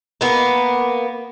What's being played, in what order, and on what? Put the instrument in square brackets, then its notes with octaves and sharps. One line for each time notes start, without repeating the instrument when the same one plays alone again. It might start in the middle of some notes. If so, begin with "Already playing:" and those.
[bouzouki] A#3 B3